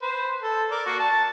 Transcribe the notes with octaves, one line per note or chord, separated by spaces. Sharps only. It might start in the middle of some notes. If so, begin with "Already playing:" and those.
B4 C5
A4
A#4 D5
A#3 F#4
A5